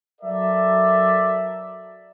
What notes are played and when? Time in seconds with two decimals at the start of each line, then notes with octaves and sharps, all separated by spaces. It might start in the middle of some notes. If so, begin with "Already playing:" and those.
0.21 F#3 A4 A#4 D5 E5